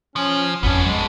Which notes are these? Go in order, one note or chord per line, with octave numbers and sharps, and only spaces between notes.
F3 C#4
G#1 F2 B3 C#4 D4
F#3 G#3